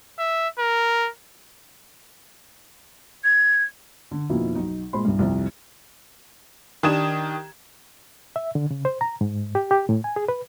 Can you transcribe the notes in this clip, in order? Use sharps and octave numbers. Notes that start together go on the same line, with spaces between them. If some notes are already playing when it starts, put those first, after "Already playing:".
E5
A#4
G#6
D3
F2 B2 F3 A#3 D#4 E4
B1 D#4
A#2 G#3 C5 B5 C6
C2 G2
C2 F2 C3
D#3 D4 G4 D#6 G#6 E7
E5
D3
C#3
C5
A#5
G#2
G4
G4
A2
G#5
G#4
B4